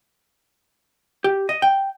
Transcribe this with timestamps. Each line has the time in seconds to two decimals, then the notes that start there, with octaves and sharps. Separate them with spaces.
1.24 G4
1.49 D#5
1.62 G5